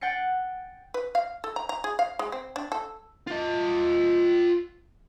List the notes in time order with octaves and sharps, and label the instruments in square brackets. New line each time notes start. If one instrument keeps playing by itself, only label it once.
[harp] F#5 G5 A6 C7 C#7
[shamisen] B4
F5
A4
A#5
A#5
G#4
F5
G#3
C4
D4
A4
[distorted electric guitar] F4 D#5